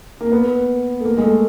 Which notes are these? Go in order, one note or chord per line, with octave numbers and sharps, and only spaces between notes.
A#3
B3
A3
A#3
G#3
A3